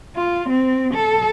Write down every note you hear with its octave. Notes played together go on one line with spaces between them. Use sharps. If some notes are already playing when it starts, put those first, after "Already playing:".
F4
C4
A4